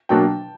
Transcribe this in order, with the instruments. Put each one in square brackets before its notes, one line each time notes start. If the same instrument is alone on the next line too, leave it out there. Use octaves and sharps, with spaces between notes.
[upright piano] B2 F#3 A#3 D4 F#4 [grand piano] G5 A5